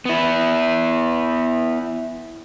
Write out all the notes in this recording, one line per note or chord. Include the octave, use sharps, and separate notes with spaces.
B3 E4